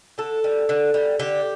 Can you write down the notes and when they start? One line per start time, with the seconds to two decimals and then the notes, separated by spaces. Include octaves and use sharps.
0.18 D3 A4
0.44 G3
0.69 D3
0.94 G3
1.20 D3 G4